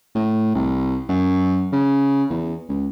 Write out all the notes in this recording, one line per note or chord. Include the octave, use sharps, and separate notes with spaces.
A2
C2
F#2
C#3
E2
C#2